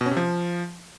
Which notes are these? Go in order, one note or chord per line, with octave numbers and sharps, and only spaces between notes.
B2
C#4
C3
F3